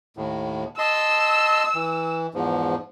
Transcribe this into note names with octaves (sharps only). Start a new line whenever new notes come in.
D#2 A2
D#5 A5 C6 E6
E3
E2 G#2 F3